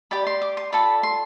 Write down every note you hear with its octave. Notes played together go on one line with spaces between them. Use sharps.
G4 D5 B5
C6
D6
C6
F4 A4 D5 B5
C6